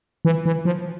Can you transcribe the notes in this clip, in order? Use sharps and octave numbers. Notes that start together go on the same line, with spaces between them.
E3
E3
F3